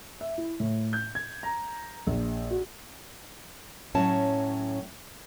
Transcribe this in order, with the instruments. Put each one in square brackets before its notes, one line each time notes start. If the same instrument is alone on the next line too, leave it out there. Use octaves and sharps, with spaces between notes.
[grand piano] E5
E4
A2
G6
G#6
A#5
A#1
F#4
[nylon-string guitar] A2 F#3 C#4 C#5 A5